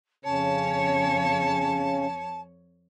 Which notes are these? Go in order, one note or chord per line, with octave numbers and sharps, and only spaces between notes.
F2 C#3 C#4 C#5 A5